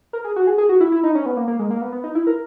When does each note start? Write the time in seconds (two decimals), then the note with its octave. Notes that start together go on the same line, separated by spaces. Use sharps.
0.13 A#4
0.24 G#4
0.36 F#4
0.47 G#4
0.58 G#4
0.69 F#4
0.80 E4
0.92 E4
1.03 D#4
1.15 C#4
1.26 B3
1.37 A#3
1.48 A#3
1.59 G#3
1.70 A#3
1.81 B3
1.92 B3
2.04 D#4
2.15 E4
2.27 A#4